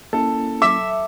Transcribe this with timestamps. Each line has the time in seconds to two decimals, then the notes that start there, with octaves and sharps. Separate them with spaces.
0.13 A#3 C#4 E4 A4
0.62 E5 D6